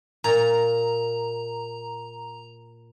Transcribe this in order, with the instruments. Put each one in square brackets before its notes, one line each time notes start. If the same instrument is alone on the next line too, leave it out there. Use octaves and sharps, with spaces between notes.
[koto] A#2 [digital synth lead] A#5